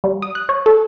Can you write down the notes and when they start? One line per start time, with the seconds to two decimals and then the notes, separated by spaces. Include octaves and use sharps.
0.04 G3
0.22 D#6
0.35 F#6
0.49 C#5
0.66 A4